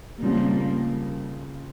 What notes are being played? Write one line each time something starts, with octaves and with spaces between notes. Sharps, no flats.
C#3 F3 G3 A#3 C4